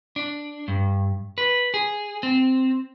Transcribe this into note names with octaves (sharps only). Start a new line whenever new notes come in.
D4
G2
B4
G#4
C4